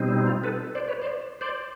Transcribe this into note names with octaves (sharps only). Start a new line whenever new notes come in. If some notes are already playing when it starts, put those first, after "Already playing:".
Already playing: B2 G3 C4 D#4
E4
F4
A4 B4
C5 D5
B4 C#5
C5 D5
C5 D5